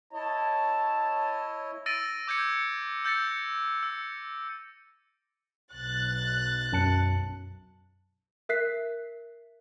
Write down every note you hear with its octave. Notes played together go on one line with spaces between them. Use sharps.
E4 C#5 D#5 A5
E6 A6 A#6 D7 D#7
D6 G6 G#6 C#7
E6 G6 A6 A#6 C#7
E6 C#7
B1 F#6 A6
F#2 A5 C#7
A#4 E5 F#6 B6 C7